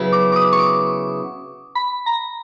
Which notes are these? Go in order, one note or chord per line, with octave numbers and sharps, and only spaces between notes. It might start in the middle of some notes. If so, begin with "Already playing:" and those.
Already playing: C#3 F#3 B3 E4
D6
D6
D#6
C#6
D6
B5
A#5